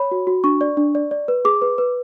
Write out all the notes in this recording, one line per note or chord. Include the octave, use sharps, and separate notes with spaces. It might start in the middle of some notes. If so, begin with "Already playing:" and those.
Already playing: C#5 B5
F#4
F#4
D4 C#6
D5
D4
D5
D5
B4
G#4 D6
B4
B4